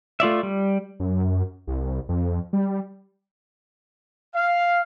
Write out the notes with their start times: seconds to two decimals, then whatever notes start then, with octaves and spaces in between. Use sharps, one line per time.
0.20 A3 F4 D5 E5
0.43 G3
1.00 F#2
1.67 C2
2.09 F2
2.53 G3
4.34 F5